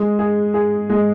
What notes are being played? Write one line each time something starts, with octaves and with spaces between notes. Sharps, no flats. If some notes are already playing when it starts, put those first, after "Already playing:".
Already playing: G#3
G#4
G#4
G#3